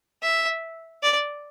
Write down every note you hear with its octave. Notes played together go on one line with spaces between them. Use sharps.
E5
D5